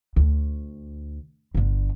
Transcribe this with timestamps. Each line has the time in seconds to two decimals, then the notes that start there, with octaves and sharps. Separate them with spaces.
0.16 D2
1.55 G1 D3